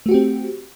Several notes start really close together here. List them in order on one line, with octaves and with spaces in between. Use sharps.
A3 F#4 G4 C4